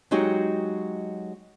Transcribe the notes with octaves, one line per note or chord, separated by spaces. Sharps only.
F#3 G#3 D#4 F#4 G4